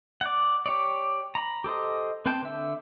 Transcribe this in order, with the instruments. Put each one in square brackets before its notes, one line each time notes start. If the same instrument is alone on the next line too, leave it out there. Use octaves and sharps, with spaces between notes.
[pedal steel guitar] D5 F#5
G4 C#5 D5
A#5 B5
G4 A4 C5 D#5
C4 B4 C5 G5 A5
D3 E5